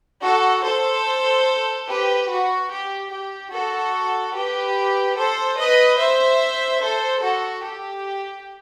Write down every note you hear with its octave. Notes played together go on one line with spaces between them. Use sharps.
F#4 A4
A4 C5
G4 B4
F#4
G4
G4
F#4 A4
G4 B4
A4 C5
B4 D#5
C5 E5
A4 C5
F#4 A4
G4